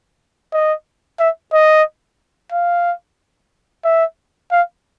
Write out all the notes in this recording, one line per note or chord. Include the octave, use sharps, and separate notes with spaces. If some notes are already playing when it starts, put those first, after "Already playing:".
D#5
E5
D#5
F5
E5
F5